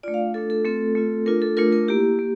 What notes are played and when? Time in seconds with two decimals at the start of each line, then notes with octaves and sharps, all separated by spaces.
0.03 A3 D4 F4 D5
0.14 F5
0.34 A3 D4 F4 A4
0.50 A4
0.65 A3 C4 F4 A4
0.95 A3 C4 F4
1.26 A3 D4 F4 A#4
1.42 A4
1.57 A3 D4 F4 A#4
1.72 A#4
1.88 A#3 E4 G4
2.19 A#3